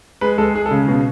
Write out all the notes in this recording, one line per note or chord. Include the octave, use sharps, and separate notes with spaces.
G#3 B4
G#3 A4
G#3 G#4
A4
C#3
B2